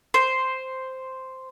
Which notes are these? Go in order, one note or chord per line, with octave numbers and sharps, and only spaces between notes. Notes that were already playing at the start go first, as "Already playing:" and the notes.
C5